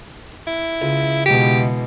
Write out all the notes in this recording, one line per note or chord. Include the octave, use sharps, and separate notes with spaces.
E4
C#2
B2 E3 G#3 G4